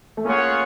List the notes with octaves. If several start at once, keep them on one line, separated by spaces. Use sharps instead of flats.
A3
A#3 C#4 F4 G#4 C#5 F#5